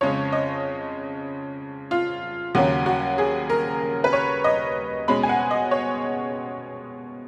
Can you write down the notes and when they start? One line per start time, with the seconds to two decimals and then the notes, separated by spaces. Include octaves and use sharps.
0.01 F2 C#3 G#3 C#4 C#5
0.33 D#5
1.91 F4
2.55 D#2 C#3 F#3 C#4 F#4
2.86 F#4
3.18 G#4
3.50 A#4
4.04 B4
4.13 C#5
4.44 D#5
5.08 B2 G#3 C#4 B5
5.23 G#5
5.29 F#5
5.51 D#5
5.71 C#5